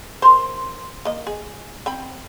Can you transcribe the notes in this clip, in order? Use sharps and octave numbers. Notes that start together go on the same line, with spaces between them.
A#4 C5
A#3 D#5
G#4
C4 G5 B5